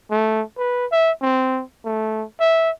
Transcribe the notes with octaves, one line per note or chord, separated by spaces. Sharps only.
A3
B4
E5
C4
A3
E5